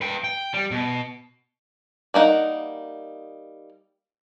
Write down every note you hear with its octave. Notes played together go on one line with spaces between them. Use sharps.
B4 G5
G5
G3
B2
G3 A#3 D#4 F#5